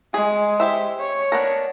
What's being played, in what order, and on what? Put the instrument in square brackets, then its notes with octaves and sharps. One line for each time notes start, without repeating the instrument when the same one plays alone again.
[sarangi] G#3 [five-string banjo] G#4
[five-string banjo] G4 C5 E5
[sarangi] C#5
[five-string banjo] B3 D4 A#4